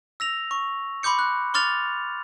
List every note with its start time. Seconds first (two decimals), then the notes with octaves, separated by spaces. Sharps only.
0.20 E6 A#6 F7
0.51 C#6
1.03 B5 C6 D6 G6 C#7
1.19 F#6
1.54 C6 D6 F6 A6 F7